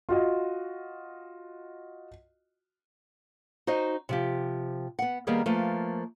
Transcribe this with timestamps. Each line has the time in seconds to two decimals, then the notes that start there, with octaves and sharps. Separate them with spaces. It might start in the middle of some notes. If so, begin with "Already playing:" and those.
0.09 F4 F#4 D#5
3.67 D#4 F#4 C5 D#5
4.09 C3 F3 G4
4.99 B3 F#5
5.27 D#3 G3 A#3 B3 G4 G#4
5.46 F3 A3 A#3 B4